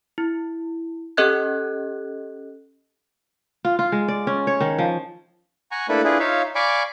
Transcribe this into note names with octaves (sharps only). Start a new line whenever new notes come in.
E4
C#4 G4 A4 D#5 F#6 G#6
F4
F4
G#3
D5
C#4
C#5
D#3
F3
F#5 G#5 A#5 C#6
A3 A#3 D4 E4 A4 B4
D4 E4 F4 G#4 B4
D#4 F4 C#5 E5 F5
D5 F5 G#5 B5 C#6 D6